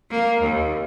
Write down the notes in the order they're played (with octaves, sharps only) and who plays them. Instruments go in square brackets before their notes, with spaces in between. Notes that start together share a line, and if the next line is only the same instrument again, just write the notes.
[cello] A#3
D#2